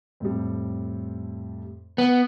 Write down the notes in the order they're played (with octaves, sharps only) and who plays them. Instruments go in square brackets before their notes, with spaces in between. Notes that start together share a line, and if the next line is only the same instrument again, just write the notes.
[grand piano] F2 A2 G3
[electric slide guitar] B3